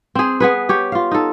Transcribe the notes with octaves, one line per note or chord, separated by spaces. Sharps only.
C4 G#4
B3 G#4 B4
G4 C#5
F4 F5
D#4 A4